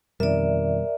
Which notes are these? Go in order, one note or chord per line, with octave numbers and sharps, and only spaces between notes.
F2 B2 D#3 G3 A#4 D5 E5